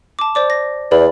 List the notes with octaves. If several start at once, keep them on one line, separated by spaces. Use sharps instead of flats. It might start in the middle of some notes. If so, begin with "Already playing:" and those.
A5 D6
C5 D5 D6
A#6
E2 D5 B5